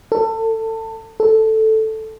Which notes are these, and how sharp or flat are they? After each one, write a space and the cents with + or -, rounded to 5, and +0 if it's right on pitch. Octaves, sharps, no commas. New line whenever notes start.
A4 +25
A4 +0